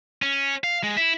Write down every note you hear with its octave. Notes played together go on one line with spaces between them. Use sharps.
C#4
F5
G#3
E4